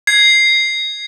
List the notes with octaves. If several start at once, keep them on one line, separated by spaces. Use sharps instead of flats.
G#6 C7